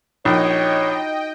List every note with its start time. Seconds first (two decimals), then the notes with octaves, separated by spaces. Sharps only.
0.25 A#1 D#4 F#4 C#5 D#5 G5